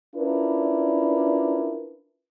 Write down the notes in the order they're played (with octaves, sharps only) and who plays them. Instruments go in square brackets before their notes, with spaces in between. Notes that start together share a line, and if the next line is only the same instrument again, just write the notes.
[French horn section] C#4 D4 E4 F4 A#4 B4